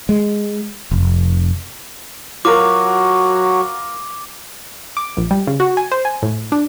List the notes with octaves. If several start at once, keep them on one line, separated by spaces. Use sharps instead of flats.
G#3
F1
F#3 F4 F#4 A#4 D6
D6
A#1
G3
C#3
F#4
G#5
C5
G#5
A2
D4